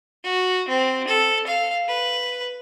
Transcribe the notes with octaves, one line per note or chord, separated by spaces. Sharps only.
F#4
C4
A4
F5
B4